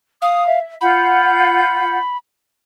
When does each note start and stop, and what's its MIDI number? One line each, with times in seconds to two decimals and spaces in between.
0.22 0.59 77
0.22 0.46 87
0.46 0.75 76
0.81 1.97 65
0.81 1.97 78
0.81 2.17 83
0.81 1.97 91